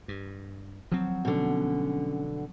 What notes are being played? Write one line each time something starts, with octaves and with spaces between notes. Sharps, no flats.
G2
F3 F#3 C4
B2 D3 C#4